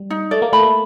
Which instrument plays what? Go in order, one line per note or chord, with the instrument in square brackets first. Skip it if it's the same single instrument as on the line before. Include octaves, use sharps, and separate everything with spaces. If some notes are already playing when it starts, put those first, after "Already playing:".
Already playing: [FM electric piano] G3
[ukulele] D#4
[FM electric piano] A3 [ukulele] D5
[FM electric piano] A#3
[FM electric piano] A3 [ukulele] B5
[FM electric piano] A3